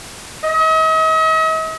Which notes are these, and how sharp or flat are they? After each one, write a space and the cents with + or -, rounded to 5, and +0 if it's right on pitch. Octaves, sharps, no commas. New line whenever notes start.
D#5 +45